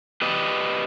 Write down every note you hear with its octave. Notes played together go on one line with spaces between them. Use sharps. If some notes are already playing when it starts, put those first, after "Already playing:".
G4 B4 D5 D#5